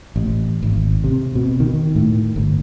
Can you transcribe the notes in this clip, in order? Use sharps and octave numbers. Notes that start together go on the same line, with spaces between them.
A1
G#1
C3
B2
D#3
A2
G1